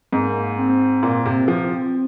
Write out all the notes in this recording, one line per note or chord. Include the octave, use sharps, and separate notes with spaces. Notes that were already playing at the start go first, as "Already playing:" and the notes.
G#2 A#3
C4
A#2
C3
F3